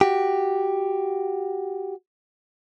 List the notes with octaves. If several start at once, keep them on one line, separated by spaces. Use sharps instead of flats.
F#4 G4